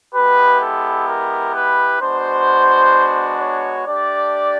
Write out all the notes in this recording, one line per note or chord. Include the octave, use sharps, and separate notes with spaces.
G#3 B3 E4 G4 B4
A4
A#4
B4
G#3 B3 D4 F#4 C5
C#5
A3 D4 G4 D5